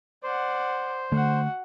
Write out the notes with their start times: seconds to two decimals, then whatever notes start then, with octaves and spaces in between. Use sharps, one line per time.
0.23 C5 D5 F#5
1.12 D3 A3 F#4 F#5